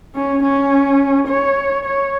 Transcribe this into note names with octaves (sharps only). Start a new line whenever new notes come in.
C#4
C#4
C#5
C#5